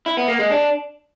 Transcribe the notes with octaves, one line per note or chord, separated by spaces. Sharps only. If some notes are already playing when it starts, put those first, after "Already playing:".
E4
B3
A#3
G#3
D4